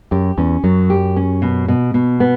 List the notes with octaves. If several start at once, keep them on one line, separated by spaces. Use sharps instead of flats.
F#2 G4
E2 C#4
F#2 F#3
G4
C#4
B2
B2
B2
B3